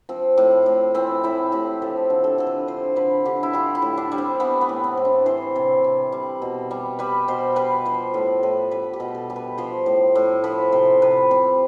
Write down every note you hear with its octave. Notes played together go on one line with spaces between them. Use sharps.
F3 C4
A2
A2
E3 C4
A2 E4
A2 G4
F3 A4
D3
A4
D3 A4
B4
F3 C5
D3 B4
D3 G4
E4
G3 F4
E4
A2
D4
G3
C4
E3 B3
B3
A2
C4
A2
D4
E3 C5
C3
C3
G3
B2
G3
G3 B4
B2 C5
G3 B4
F3 C5
A2 A4
A2 B4
G3 B4
G4
B2
A4
G3
B4
F3 C5
A2
A2
F3 B4
C3 C5
C3 B4
G3 C4